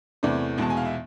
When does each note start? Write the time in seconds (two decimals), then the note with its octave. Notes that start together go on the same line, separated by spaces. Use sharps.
0.23 E2 C3 E3 A3 D5
0.58 E2 B2 G#3 A5
0.70 G#5
0.77 F5
0.85 E5